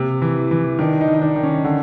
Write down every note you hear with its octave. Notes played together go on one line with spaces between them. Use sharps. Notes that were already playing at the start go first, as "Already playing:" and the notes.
Already playing: C3 A#3
E3
E3
D#3 D4
D#4
D#3
D#4
D4
D#3
C#4
D3